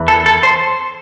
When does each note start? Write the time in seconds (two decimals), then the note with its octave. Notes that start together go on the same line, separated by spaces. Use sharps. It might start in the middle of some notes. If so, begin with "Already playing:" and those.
Already playing: E2 E3
0.08 A4
0.26 A4
0.43 C5